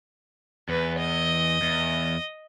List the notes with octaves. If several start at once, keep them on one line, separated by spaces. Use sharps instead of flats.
E2 B4
D#5
E2